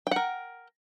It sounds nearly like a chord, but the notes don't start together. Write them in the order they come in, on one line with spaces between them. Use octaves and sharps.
G5 F#5 A#4